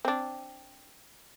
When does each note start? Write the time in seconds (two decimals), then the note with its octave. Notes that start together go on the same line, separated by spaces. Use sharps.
0.05 C4 D4